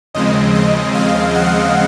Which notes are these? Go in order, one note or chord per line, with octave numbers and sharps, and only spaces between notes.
D#2 C#3 F3 G#3 C4 D#5
D#5
F5
F#5